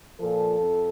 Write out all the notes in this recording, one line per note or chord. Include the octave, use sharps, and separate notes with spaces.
A#2 F3 A4
F2